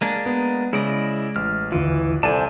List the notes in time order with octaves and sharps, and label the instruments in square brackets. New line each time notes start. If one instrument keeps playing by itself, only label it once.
[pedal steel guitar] G#3 A#3 D4
[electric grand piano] B3
[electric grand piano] C#3 [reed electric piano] G#3 [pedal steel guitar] E4 D5 D#5
[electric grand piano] A1 [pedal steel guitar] F6
[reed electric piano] D#2 D3 F4 [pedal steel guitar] E3
[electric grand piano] C2 [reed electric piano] A4 D5 [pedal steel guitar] C5 G#5 A5